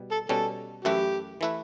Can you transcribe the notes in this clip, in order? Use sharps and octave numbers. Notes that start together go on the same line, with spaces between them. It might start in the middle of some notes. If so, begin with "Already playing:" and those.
Already playing: B2 G3
A4
B2 G3 C#4 A4
F#2 E3 A3 E4 G4 B4
E3 A3 E4 B4